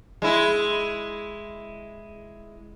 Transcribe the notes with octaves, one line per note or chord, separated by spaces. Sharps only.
G#3 E4